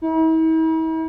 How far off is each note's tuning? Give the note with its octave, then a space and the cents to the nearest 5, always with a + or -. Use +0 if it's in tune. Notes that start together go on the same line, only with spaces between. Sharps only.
E4 -45